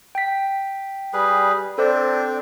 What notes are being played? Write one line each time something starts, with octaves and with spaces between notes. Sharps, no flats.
G5 B6
G3 G#4 B4
C4 D4 A4 C5 D5